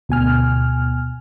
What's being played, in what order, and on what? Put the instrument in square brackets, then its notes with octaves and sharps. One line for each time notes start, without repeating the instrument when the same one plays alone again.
[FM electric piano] D2 B2 G#5 F6